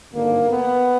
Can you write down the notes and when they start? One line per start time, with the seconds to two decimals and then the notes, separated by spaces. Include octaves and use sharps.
0.12 G#1 G2 D3 A#3
0.49 B3